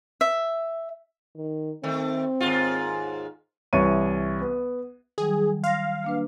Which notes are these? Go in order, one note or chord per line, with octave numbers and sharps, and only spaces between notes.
E5
D#3
D#3 A3 C4
D#2 G#2 F4
C2 E3 C#5 C#6 D#7
B3
D#3 F#3 G3 G#4
F5 C6 F6 A#6
A#3 D4 B4